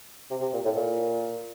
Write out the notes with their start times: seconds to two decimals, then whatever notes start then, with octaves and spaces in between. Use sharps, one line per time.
0.31 C3
0.42 C3
0.53 A#2
0.65 A2
0.76 A#2